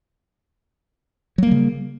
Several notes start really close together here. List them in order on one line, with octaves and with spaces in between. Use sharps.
F#3 A#3 G3 C#3